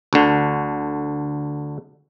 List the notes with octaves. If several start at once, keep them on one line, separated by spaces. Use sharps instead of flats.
D2 D3